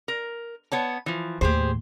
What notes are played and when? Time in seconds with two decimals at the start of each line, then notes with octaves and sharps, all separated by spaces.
0.08 A#4
0.72 B3 C#5 A5
1.06 E3 F3
1.41 D#2 A2 G4 G#4 C5